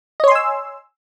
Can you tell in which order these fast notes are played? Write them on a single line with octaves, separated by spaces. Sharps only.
D#5 C#5 C6 G#5 E6